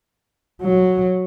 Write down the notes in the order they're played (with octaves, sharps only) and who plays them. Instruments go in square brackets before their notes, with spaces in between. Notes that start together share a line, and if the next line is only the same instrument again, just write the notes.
[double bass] F#3